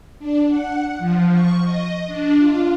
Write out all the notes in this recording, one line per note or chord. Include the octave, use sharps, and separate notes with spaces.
D4
F#5
F3
C#6
D#5
D4
F4